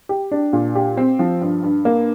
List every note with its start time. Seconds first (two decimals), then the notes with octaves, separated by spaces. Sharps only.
0.09 G4
0.31 D4
0.53 A#2
0.75 G4
0.97 C4
1.19 F3
1.41 G2
1.63 G2
1.85 A#3